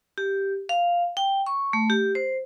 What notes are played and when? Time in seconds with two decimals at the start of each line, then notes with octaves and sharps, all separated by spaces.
0.18 G4
0.69 F5
1.17 G5
1.46 C#6
1.73 A3
1.90 G4
2.15 C5